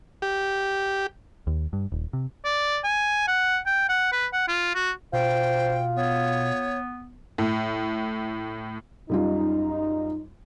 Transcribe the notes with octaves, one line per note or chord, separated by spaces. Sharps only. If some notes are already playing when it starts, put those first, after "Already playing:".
G4
D#2
G2
D#1
C3
D5
G#5
F#5
G5
F#5
B4
F#5
F4
F#4
B2 F4 C5 G5
B3 C#5
A2
F#2 G3 D#4 F4